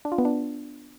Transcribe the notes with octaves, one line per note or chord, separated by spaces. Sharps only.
D4
F4
B3
D4